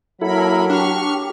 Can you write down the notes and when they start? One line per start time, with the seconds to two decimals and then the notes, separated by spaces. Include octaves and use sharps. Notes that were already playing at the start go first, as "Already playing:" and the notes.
0.21 F#3 A#3 E4 A4 A#4 B5
0.70 D4 G4 C#6 F6